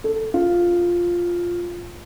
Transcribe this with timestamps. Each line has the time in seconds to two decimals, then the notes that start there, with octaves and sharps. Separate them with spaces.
0.04 A4
0.34 F4